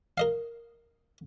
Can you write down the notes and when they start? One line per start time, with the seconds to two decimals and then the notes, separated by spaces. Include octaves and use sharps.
0.18 A#4 D#5 F5